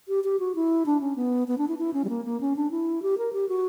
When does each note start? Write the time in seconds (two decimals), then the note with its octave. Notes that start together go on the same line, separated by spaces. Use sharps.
0.08 G4
0.24 G4
0.40 F#4
0.55 E4
0.86 D4
1.01 C#4
1.16 B3
1.48 B3
1.58 D4
1.68 E4
1.78 E4
1.94 C#4
2.05 G3
2.09 A#3
2.25 A#3
2.41 C#4
2.56 D4
2.71 E4
3.02 G4
3.18 A#4
3.33 G4
3.49 F#4